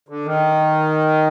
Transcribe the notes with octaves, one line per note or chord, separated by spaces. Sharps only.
D3
D#3